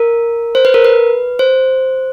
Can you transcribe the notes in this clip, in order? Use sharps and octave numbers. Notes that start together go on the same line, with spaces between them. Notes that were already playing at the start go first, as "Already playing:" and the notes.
Already playing: A#4
C5
B4
A#4
B4
C5